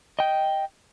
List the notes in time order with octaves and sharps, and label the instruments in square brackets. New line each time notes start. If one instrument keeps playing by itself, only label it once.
[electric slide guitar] D#5 G5